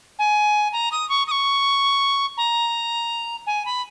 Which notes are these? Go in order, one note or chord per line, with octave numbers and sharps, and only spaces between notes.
G#5
A#5
D#6
C#6
D#6
C#6
A#5
G#5
B5